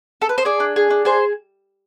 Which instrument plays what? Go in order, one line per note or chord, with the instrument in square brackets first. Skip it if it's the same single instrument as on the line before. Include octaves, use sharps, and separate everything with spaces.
[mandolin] A4
B4
C5
G#4 D5
D4
G#4
D4
G#4 C5